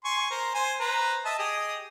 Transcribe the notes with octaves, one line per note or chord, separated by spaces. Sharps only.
G#5 C6 C#6
A#4 C5
C5 G#5
B4 C5 A#5
D#5 E5 A5
G4 G#4 D#5